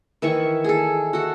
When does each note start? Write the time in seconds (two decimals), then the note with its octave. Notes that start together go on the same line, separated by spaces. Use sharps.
0.22 D#3 E3 E5 C#6
0.64 G#4 A4
1.13 F#4 A4